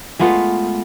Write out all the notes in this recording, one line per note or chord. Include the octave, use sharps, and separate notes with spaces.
G#3 A3 B3 F4